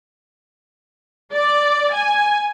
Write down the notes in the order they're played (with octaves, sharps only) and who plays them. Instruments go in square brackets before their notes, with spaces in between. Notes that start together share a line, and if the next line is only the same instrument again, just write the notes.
[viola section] D5
G#5